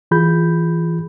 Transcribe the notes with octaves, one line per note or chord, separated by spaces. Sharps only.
E3 F4 G#4 B5 G6